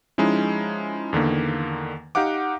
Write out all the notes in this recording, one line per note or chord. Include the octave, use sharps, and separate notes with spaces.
F3 G#3 C#4 D#4 E4
E2 D3 D#3 A#3
D#4 G4 F5 F#5 D6